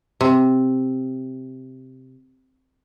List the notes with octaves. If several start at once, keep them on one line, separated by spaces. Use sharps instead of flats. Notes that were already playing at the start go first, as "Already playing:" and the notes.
C3